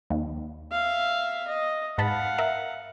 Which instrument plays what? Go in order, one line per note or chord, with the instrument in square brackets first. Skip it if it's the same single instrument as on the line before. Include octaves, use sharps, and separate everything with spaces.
[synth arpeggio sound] D#2
[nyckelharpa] E5 F5
D#5
[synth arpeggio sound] G#2 A5 B5 [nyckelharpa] F5 F#5
[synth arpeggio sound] A#4 E5